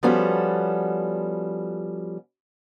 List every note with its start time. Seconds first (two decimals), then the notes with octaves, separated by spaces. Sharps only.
0.03 F3 G3 B3 C#4 F#4 A4